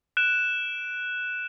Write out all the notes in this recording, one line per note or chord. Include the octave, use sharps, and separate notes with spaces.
F#6 D7 E7